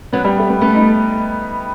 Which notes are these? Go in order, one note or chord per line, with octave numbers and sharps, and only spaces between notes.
F#3 B3
G3
A3
B3
A3 B3
D#4